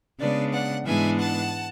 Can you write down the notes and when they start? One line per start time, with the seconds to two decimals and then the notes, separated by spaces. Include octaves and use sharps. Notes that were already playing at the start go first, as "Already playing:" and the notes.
0.20 C#3 G#3 B3 D4 B4 D5
0.53 D5 F#5
0.86 G#2 E3 G#3 B3 D4 E5 G#5
1.18 F#5 A5